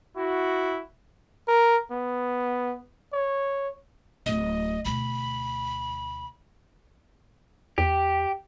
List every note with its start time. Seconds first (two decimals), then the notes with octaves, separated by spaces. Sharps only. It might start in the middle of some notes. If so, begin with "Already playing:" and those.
0.17 E4 F#4
1.48 A#4
1.91 B3
3.13 C#5
4.26 D1 D#5
4.85 D2 B2 B5
7.78 E2 G4